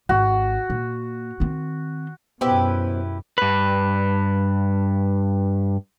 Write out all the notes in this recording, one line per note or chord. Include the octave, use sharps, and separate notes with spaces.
G#1 F#4
A#2
D#3 C4
F#2 B2 B3 E4 G4 B4 C5
G2 B4